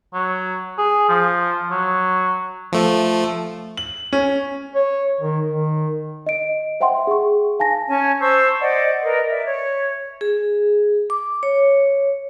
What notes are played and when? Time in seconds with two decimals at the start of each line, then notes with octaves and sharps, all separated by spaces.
0.14 F#3
0.79 G#4
1.09 F3
1.71 F#3
2.72 F3 A3
3.77 F#7
4.13 C#4
4.75 C#5
5.21 D#3
5.47 D#3
6.26 D#5 D7
6.80 C5 E5 F#5 G5 C6
7.07 G#4 C#6
7.59 F5 G#5 A5 A#6
7.88 C#4 C#5 G#5 A5
8.20 C5 A5 C#6 E6
8.61 C5 D5 D#5 F#5
9.02 A#4 B4 D5 D#5
9.30 D5 E5
9.47 C#5
10.21 G#4
11.10 D6
11.43 C#5